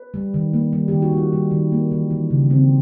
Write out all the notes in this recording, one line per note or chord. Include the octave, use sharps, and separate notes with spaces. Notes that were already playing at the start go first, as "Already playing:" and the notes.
Already playing: B4
G3
D#3
A#3
G3
D#3 G4
F#4
G3 F4
G3
D#3
A#3
E3
E3
C#3
C#3 C4